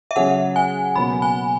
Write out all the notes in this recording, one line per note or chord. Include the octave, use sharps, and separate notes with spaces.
E5
C#3 F#3 C#4 G#4 F#5
G#5
C#2 B2 F#3 A#3 B5
G#5